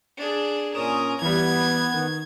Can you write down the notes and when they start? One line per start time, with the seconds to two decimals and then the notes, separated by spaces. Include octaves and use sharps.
0.18 D4 G#4
0.75 A#2 C#4 A#4 D#6 E7
1.22 E3 G3 B3 G#6
1.94 D#3